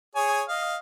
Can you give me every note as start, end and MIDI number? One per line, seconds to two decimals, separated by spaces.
0.15 0.43 68
0.15 0.43 73
0.15 0.43 80
0.49 0.77 75
0.49 0.77 77